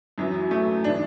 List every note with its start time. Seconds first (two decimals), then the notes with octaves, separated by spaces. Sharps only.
0.18 F#2 E3 F#3
0.51 A3
0.84 E3 D4